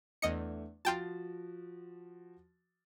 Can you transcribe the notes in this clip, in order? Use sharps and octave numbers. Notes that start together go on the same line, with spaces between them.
E2 A3 D4 D#5 C#7
F3 F4 F#4 G5 A5 A6